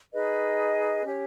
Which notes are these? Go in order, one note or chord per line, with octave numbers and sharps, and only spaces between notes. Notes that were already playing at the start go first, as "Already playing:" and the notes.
D#4 G#4 B4 D#5
C#4 G4 C#5